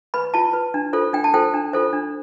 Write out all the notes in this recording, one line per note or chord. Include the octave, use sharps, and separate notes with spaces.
B4 B5
F4 A5
B4
D4
F4 A4 C5
D4 G5
A5
F4 A4 C5 G5
D4
F4 A4 C5
D4